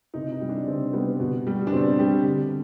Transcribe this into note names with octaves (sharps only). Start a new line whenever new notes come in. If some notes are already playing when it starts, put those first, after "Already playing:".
C3 D#4
D#4
G3
D4
C3 C4
G3 B3
B2
G3
D4
B2 C4
G3 G4
D3